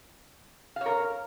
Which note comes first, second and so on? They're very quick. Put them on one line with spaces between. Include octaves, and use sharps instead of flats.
F5 C#5 A#4